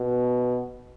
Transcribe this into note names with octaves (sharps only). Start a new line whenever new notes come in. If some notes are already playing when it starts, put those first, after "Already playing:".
Already playing: B2